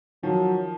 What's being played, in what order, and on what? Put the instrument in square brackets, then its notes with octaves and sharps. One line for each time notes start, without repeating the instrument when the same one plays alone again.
[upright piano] D#3 F3 [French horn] F#3